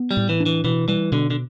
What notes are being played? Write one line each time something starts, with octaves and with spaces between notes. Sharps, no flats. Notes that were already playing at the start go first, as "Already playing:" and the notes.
Already playing: B3
G3
A2
E3
D4
E3
B2 E3
E3 G3
B2 D3
D3